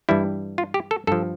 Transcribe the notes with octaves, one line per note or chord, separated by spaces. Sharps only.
G2 E3 G3 E4
F4
G4
A4
G2 F3 A4